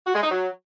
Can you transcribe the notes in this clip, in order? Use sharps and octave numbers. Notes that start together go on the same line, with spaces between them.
F#4
G#3
D#4
F#3